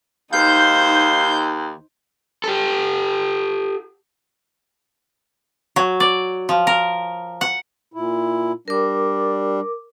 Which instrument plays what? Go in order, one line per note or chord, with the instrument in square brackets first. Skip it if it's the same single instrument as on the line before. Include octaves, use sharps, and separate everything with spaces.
[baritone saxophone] D#2 [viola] D#4 C5 [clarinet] F5 [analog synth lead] G6
[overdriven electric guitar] G4 A4
[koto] F#3
D5
F3
A#4
F#5
[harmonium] A#2 E4
[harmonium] G3 D4 [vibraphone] A#4 D6